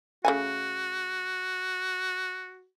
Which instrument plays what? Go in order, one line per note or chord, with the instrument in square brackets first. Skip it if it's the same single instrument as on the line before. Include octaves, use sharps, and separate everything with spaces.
[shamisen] C#3 A3 G#5 [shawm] F#4